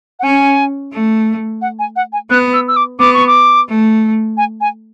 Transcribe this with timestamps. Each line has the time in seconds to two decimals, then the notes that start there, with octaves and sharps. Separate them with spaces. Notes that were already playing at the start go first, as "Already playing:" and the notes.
0.19 F#5
0.23 C#4 G#5
0.92 A3
1.61 F#5
1.79 G#5
1.96 F#5
2.13 G#5
2.30 B3 F#6
2.53 E6
2.68 E6
2.76 D6
2.99 B3 D6
3.14 C#6
3.27 D6
3.68 A3
4.37 G#5
4.61 G#5